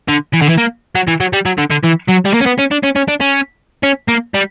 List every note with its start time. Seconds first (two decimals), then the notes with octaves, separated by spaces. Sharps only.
0.08 D3
0.33 E3
0.41 D3
0.49 E3
0.57 A#3
0.95 F#3
1.07 E3
1.20 F#3
1.33 G3
1.45 F#3
1.58 D3
1.70 D3
1.83 E3
2.08 F#3
2.25 G3
2.34 A#3
2.40 C#4
2.46 B3
2.58 C#4
2.71 D4
2.83 C#4
2.96 C#4
3.08 D4
3.21 C#4
3.83 C#4
4.08 A#3
4.34 G3